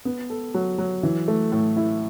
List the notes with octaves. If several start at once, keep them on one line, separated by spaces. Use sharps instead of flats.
B3
A4
F#3
F#3
E3
A3
A2
E4